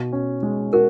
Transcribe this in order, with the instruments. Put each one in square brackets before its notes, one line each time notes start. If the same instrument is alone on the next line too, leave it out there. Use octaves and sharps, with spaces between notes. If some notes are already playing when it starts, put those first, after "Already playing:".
Already playing: [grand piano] B2
C#4
G#3
[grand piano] F#4 [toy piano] A#4